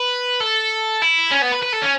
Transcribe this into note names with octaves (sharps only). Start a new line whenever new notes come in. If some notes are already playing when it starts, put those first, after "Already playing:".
Already playing: B4
A4
E4
C#4
B3
B4
B4
A4
C#4